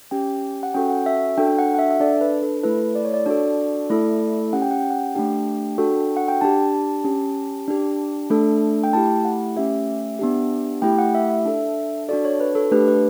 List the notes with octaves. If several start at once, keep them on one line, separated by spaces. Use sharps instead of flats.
C#4 G4 G5
F#5
C#4 F#4 A4 G5
F#5
E5
D4 F#4 A4 G5
F#5
F#5
E5
E5
D4 A4 D5
B4
A4
A3 E4 A4 B4
D5
C#5
D5
D4 F#4 A4 D5
A3 E4 A4
C#4 G4 F#5
G5
F#5
G5
F#5
A3 D4 G4 G5
D4 F#4 A4
F#5
G5
D4 G4 A5
C#4 G4
D4 G4
A3 D4 A4
G5
A3 E4 G4 A5
F#5
A3 C#4 G4 E5
B3 D4 G4
A3 E4 G4 G5
F#5
E5
E5
D4 A4
D4 F#4 A4 D5
C#5
B4
A4
A3 D4 G4 B4
B4